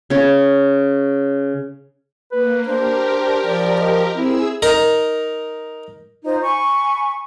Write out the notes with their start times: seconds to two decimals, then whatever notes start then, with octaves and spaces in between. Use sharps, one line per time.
0.10 C#3 C#5
2.32 A#3 B4
2.66 D4 G4 A#4 C5
3.45 F3 D5
3.78 D#5
4.15 C4 E4 G#4 E6
4.62 D#4 A#4
6.24 D#4 F4 C5 D#5
6.42 G#5 B5 C#6